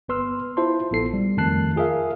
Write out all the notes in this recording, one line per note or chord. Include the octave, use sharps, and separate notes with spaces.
G1 B3 B4 C6 E6 F6
E4 F4 C5 A5 C6
A#1 B3 E4 A4 C7
G3
F2 D#3 A3 A5 F#6 C7
F4 G#4 A#4 E5 F5